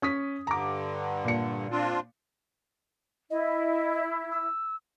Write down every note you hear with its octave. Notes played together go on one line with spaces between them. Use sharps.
C#4 D#6 B6
G2 D3 A#5 D6
A#2 C#7
C4 D4 F4
E4 D#5
E6